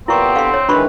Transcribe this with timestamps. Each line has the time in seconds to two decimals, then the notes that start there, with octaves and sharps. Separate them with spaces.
0.08 A#2 B3 C4 E4 G4 C#6
0.36 D3 F5 C6
0.54 C#5
0.69 D#3 E3 G#3 D4 B4 B5 C#6